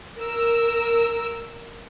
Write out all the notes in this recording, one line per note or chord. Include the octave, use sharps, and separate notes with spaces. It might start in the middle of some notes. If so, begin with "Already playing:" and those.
A#4 E6